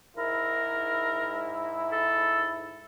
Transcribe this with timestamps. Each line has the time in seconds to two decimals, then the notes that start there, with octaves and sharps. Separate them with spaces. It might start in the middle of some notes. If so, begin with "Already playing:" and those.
0.17 G#2 E4 A#4
1.92 A4